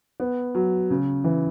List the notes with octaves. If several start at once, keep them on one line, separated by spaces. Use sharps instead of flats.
B3
F#3
C#3
E3